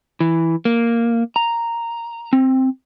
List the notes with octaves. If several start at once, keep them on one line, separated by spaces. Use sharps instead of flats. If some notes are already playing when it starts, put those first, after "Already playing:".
E3
A#3
A#5
C4